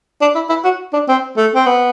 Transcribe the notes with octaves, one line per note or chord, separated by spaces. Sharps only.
D4
E4
E4
F#4
D4
C4
A3
C4
B3